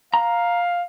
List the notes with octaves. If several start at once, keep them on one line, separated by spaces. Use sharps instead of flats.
F5 A#5